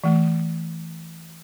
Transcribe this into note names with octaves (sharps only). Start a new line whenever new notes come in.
E3 A3